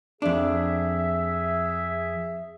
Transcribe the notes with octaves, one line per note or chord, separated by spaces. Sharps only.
F2 D4 G#4 E5